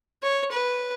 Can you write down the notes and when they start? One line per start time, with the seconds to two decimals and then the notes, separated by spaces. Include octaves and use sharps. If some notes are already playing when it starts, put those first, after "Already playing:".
0.23 C#5
0.52 B4